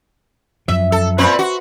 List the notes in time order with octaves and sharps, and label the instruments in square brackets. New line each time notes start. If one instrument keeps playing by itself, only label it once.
[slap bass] F#2 F3 [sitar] E5
[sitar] A4
A#2 C4 B4
F#4